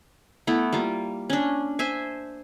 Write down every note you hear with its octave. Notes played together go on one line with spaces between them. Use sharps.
A3 B3 E4
G3 A#3 F4
C#4 D4
C5 E5 G#5